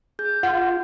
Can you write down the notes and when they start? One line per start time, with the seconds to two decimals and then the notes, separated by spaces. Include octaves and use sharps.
0.19 G#4 G6
0.43 F4 F#5